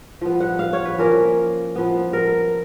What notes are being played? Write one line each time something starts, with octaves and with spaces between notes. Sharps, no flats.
F3 B3
F#5
F5
C#5
B4
F3 A#3 C#4 A#4
F3 B3
A#4